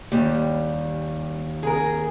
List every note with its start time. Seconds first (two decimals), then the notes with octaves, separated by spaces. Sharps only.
0.12 D#2 G3
1.63 G#4 A#4